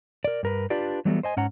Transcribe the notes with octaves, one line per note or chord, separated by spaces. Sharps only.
A#4 D5
G2 A#4 B4
D4 F4 G4 B4 D5
E3 F#3 G3 A3 B3
C5 D#5 G#5
G#2 C#4 F#5 A#5